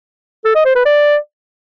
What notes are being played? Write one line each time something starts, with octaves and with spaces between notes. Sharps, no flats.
A4
D#5
C5
B4
D5